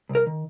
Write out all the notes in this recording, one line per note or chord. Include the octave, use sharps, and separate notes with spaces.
C2
A#4
D#3